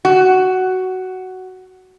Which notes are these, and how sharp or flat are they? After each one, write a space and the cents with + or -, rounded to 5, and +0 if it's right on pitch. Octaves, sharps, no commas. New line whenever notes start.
F#4 +10